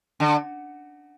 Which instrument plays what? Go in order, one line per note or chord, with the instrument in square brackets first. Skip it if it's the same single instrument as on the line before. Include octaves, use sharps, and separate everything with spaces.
[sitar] D3